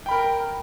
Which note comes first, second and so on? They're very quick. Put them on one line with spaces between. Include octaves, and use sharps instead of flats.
G5 B5 A#4